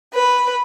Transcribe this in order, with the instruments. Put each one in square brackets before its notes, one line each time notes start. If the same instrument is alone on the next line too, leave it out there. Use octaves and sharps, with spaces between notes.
[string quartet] B4